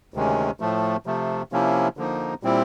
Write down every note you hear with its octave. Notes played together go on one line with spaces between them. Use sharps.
D2 C3 D#3 G#3 C#4
A2 F3 A3
C3 F3 A3
C3 F3 A#3 C#4 E4
D3 F3 A#3 D#4
A#2 G3 C4 E4